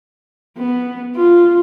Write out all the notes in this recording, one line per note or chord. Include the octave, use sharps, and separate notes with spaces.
B3
F4